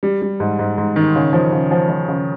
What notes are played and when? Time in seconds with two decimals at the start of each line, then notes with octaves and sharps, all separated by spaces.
0.03 G3
0.22 G3
0.40 G#2
0.59 G#2
0.78 G#2
0.96 D#3
1.15 C#3
1.33 F3
1.52 C#3
1.71 F3
1.89 F3
2.08 C#3